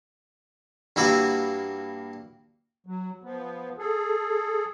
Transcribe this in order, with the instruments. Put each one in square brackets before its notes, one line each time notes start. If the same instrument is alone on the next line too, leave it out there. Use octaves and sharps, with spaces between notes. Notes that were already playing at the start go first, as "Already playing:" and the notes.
[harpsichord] G2 A#3 E4 F#4
[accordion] F#3
F3 B3
G#4 A4